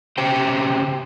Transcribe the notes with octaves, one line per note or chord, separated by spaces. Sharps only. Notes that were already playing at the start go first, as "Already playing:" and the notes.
C#3 G4 C5 G5